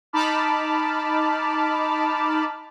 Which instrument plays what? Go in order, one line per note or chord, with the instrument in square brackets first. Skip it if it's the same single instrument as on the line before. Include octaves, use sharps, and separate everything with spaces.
[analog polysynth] D#4 A5 B5 D6 F6